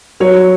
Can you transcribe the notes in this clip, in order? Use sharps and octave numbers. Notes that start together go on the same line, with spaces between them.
F#3 C#5